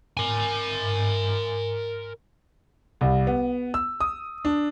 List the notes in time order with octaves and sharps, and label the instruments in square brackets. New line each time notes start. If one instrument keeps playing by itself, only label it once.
[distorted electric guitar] A#4 G#5
[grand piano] C2
B3
E6
D#6
D4